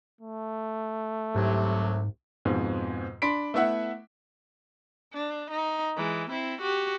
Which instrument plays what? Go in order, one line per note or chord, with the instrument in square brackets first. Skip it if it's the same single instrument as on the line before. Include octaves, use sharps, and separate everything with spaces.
[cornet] A3
[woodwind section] C2 C3 F#3 [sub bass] G#2
[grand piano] F2 G#2 B2
D4 B5 C6 B6 D7
A3 B3 E4 E5 F#5
[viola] D4
D#4
E3 G#3
C4 E4
F#4 G4